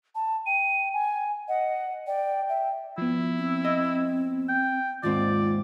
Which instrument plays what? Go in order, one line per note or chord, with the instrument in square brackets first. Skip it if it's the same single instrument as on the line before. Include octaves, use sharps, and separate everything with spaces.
[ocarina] A5
[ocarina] G5 [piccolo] D#7
[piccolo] G#5
[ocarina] D#5 [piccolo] F#5
[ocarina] D5 [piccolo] G5
[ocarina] E5
[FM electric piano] F3 B3 [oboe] E4
[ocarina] C4
[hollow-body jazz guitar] D#5
[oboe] G5
[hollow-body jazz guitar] D#2 G#2 C4 [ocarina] F4 [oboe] D5 [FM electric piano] A6